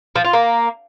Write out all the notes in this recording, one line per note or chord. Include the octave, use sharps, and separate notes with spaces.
F3
F4
A#3